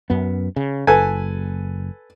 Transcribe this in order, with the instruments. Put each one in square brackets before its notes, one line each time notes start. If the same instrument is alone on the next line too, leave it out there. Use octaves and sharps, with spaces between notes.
[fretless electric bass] F#2 B3
C#3
[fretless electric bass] F#1 [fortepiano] A4 B4 G#5